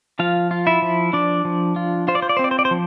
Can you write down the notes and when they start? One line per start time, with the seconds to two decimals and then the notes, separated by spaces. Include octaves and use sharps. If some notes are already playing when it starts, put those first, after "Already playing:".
0.19 F3 F4 F5
0.51 F4
0.67 E4 E5
0.82 F3
1.13 F3 D4 D5
1.45 F3
1.76 F4
2.08 F4 C5
2.15 D5
2.22 C5
2.29 D5
2.37 C4 C5
2.44 D5
2.51 C5
2.59 D5
2.65 C5
2.71 F3